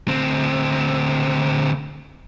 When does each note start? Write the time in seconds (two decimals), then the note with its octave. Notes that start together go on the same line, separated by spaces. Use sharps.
0.08 D2 C4